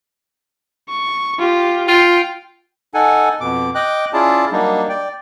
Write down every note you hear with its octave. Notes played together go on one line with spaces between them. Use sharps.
C#6
F4 G4
F4 G5
D#4 A4 F#5 G#5
F2 B2 D6
D#5 G5 D6 F#6
C#4 E4 F4 G#4 D5 A5
F#3 G3 A#3 D4 D#4
D5 G5